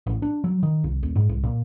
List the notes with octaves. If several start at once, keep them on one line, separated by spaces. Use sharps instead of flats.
A1
D4
F#3
D#3
C2
D#1
G#2
C2
A#2